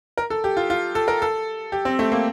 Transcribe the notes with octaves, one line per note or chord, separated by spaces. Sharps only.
A#4
A4
G4
F4
F4
A4
A#4
A4
G4
C4
A3
A#3